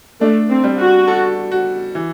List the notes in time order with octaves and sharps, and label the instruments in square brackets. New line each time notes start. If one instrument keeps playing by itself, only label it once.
[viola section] A3 [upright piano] D4
[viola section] C4
[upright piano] G3
[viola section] F#4
[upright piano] A4
F#4
E3